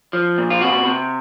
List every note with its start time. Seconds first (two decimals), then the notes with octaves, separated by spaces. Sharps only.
0.13 F3
0.38 A#2
0.50 F4
0.61 C3 F#4
0.86 C3